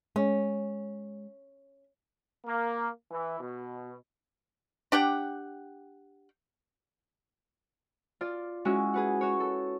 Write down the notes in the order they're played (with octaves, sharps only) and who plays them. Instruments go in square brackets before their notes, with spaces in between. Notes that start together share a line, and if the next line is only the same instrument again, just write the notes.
[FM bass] G#3 [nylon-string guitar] C#4
[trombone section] A#3
E3
B2
[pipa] D4 G4 F#5 G5
[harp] F4 D5
G#3 C#4 E4 F#4
G#4 B4 F#5
F#4 C#5
A4